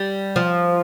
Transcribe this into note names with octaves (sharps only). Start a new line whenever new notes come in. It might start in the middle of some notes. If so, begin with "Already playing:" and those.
Already playing: G3
F3